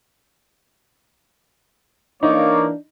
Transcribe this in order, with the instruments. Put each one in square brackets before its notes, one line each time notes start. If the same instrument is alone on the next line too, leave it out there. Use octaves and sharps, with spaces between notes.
[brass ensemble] E3 A#3 [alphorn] D4 [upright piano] D#4 [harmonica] C#5 D6